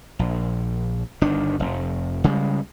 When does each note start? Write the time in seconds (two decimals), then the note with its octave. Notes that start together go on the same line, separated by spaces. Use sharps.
0.19 A#1
1.21 G1 D#3 D4
1.60 F1
2.24 C#3 G3 G#3